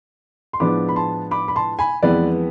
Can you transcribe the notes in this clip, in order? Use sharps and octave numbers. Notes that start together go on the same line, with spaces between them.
C6
A2 F3 G#3 B3 D4 B5 D6
B5
A5 C6
B5 D6
B5
A5 C6
G#5 B5
F2 E3 G#3 B3 B4 D5